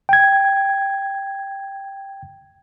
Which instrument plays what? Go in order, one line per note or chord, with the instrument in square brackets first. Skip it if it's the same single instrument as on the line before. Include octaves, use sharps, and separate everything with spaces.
[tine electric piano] G5 G#6